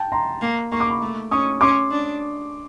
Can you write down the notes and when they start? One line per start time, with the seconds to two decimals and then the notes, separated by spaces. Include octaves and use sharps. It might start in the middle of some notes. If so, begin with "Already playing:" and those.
Already playing: G5 A5
0.12 A#5 C6
0.41 A#3
0.72 A#3 C#6
0.80 D6
0.90 B5 C#6
1.01 A3
1.31 C#4 C#6 D#6
1.61 C#4 C6 D6
1.91 D4